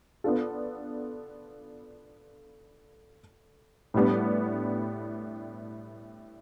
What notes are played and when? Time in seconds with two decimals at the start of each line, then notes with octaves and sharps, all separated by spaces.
0.24 B3 D4 F4 A4
3.94 A2 G3 B3 D4